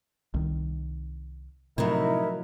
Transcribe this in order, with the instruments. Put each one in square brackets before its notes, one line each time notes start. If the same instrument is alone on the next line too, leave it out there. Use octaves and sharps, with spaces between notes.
[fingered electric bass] C2 D#3
[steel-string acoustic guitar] A2 F3 F#3 [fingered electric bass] C3 [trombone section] D#4 E4 [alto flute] A#4